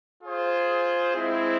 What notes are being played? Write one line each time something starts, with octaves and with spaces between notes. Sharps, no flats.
F4 G#4 C5
G#3 C4 E4